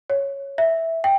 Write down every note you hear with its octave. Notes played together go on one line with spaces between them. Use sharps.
C#5
E5
G5